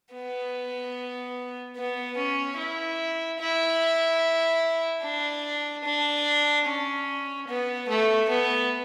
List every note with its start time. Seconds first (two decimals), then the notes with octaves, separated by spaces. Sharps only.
0.13 B3
1.76 B3
2.17 C#4
2.58 E4
3.40 E4
5.03 D4
5.84 D4
6.66 C#4
7.48 B3
7.88 A3
8.29 B3